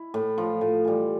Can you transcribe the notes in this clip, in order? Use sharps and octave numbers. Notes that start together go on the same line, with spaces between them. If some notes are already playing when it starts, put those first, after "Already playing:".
Already playing: E4
A2
F3
A2
E3 G3